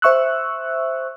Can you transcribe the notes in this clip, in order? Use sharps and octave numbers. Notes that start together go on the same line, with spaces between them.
C5 E5 C#6 E6 F#6